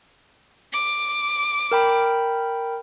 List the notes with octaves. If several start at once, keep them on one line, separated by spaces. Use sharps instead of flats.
D6
A#4 G5 B5